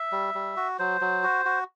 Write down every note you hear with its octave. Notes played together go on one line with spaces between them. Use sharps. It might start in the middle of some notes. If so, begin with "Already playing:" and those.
Already playing: E5
G3
G3
F#4
F#3 C5
F#3
F#4
F#4